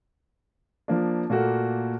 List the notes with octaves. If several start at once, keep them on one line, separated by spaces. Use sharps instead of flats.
F3 A#3 D4
A#2 A3 A#3 F#4